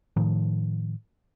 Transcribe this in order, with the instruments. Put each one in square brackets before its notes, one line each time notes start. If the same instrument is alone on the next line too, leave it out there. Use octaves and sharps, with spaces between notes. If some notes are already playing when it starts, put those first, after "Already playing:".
[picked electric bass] A2 D#3 F3